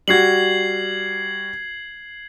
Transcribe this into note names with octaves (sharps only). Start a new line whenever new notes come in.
G3 F#4 G#6 C7 F#7